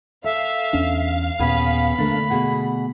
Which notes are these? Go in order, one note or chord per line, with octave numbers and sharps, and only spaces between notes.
A4 E5 F5
E2 C#4 D4
D#2 A#2 B3 C#4 G#4 B5
D3 A3 A#3 D4 A4 A#4
B2 G#4 F#5